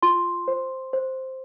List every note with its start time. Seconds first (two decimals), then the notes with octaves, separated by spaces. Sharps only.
0.03 F4 C6
0.48 C5
0.93 C5